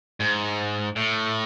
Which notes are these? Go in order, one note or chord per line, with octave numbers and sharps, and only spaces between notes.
G#2
A2